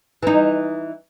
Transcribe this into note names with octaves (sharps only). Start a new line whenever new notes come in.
E3 D#4